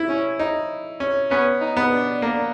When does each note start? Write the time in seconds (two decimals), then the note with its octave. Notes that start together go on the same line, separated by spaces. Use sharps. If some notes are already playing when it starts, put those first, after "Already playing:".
Already playing: E4
0.09 C#4
0.39 D#4
1.00 C#4
1.30 B3 C#4
1.61 D#4
1.77 B3
1.92 D4
2.22 A#3